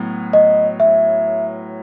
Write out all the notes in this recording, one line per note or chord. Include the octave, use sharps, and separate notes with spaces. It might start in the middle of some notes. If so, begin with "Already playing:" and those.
Already playing: A2 F#3 B3
D#5
E5